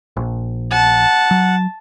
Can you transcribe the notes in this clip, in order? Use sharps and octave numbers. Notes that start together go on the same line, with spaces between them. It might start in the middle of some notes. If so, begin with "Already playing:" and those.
A#1
F#5 A5
F#3